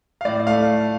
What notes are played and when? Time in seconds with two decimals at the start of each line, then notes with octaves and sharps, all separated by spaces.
0.21 F5
0.25 A2 D5
0.47 A3 F5